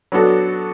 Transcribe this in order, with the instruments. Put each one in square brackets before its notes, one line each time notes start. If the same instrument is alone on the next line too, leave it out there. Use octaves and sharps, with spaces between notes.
[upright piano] F#3 B3 D4 F#4 A4